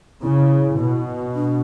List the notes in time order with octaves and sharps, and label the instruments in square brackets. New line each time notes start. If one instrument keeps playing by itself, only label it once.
[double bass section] C#3 [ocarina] E4
[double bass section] B2
[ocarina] D4